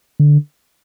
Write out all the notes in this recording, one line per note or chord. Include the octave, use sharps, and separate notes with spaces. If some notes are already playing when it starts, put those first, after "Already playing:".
D3